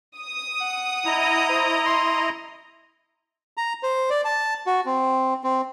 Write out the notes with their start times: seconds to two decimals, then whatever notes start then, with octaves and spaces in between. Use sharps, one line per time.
0.19 D#6
0.61 F#5
1.05 E4 D#5 A#5
1.49 C5
1.86 C6
3.57 A#5
3.83 C5
4.10 D5
4.25 A5
4.67 F#4
4.86 C4
5.44 C4